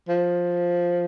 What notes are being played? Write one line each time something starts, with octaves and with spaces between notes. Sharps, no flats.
F3